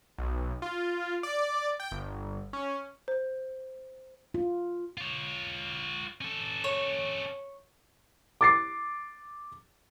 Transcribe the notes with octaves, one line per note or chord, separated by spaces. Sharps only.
B1
F4
D5
G5
G1
C#4
C5
F4
F4 C#5
C#4 A4
C#5
D6 A6 C7